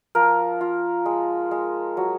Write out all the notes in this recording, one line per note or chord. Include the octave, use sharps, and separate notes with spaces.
F3 A#4
F4
G#3
G#3
F#3